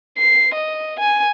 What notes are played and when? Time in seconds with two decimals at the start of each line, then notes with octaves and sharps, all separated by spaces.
0.18 C7
0.54 D#5
1.00 G#5